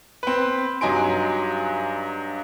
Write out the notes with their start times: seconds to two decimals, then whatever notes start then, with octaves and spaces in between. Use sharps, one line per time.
0.23 C4 B4
0.81 G2 F#3 D#4 G#5 C6 D7